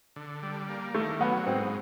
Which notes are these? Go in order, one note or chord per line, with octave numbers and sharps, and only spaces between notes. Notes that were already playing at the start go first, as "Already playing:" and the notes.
D3
G3
A#3
D#3 A3
F#3 B3
G#2 C4